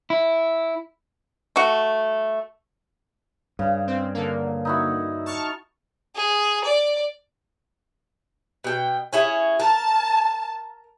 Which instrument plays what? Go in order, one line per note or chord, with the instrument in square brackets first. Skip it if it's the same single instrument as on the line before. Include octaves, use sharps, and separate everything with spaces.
[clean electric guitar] E4
[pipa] A3 F#4
[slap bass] G2 [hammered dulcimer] C#3
[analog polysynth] C4
D3 A#3
[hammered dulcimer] D#4 E4 F#4
[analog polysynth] A5 C#6 F6
[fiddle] G#4
D5
[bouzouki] B2 G5
C#4 E4 G#4
[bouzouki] A#4 [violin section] A5